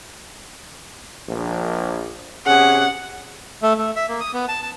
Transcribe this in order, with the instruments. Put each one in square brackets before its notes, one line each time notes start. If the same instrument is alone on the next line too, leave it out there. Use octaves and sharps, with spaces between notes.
[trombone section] A#1
[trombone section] C3 C#4 G#4 [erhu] F#5
[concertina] A3
A3
E5
A#3
D#6
B3
A5
A5